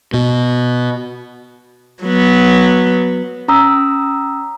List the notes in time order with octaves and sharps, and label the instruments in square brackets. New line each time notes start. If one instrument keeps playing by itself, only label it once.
[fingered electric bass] B2
[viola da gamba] F#3 B3
[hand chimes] C#4 A#5 D#6 E6 B6